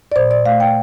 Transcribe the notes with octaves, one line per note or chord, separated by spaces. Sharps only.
D5
A#2 C5
D5
A3 F5
G5